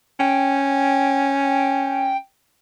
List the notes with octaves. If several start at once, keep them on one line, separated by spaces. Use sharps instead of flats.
C#4 G5